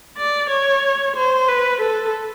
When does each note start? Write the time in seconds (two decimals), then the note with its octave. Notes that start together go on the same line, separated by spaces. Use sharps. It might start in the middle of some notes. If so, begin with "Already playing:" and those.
0.17 D5
0.50 C#5
1.16 C5
1.48 B4
1.80 A4